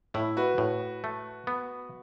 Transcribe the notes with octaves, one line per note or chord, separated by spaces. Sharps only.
A2 E4
F#4 B4
A2
A3
B3